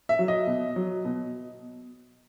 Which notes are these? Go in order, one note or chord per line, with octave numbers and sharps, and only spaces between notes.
E5
F#3
D#5
B2
F#3
B2